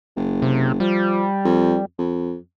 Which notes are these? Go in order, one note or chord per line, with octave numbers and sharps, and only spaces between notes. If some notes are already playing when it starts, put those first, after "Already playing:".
F#1
C3
F3 G3
F2
F2